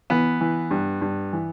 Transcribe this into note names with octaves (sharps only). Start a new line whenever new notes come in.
E3 B3
E3
G2
G2
E3